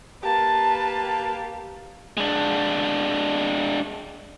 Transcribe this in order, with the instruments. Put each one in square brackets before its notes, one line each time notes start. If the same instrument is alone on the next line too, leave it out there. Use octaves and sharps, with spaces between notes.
[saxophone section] A#3 G4 [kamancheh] B4 A5
[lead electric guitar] G#3 D4